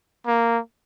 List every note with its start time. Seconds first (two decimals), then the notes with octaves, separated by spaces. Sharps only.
0.27 A#3